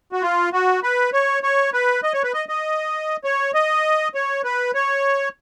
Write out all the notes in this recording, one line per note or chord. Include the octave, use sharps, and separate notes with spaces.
F#4
F4
F#4
B4
C#5
C#5
B4
D#5
C#5
B4
D#5
D#5
C#5
D#5
C#5
B4
C#5